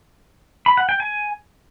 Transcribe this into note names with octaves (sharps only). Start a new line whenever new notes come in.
B5
F#5
G5
G#5